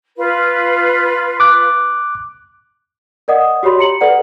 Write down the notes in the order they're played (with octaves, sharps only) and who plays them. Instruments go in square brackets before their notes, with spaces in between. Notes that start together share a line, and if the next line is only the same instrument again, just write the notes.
[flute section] F4 B4
[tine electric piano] D6 F#6
[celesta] A#4 D5 D#5 F#5 D#6
F#4 G4 C#5 B5 C6
A#5 C#7 F#7
A4 B4 D5 F#5